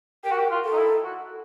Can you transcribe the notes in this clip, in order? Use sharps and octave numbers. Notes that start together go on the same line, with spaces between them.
G4 A#4
F#4
G4
F4
A4
D#4
E4
F#4